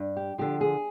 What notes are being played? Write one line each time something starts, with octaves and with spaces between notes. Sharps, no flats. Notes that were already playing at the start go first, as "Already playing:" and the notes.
Already playing: G2
G4
D3 F3 G4
G#4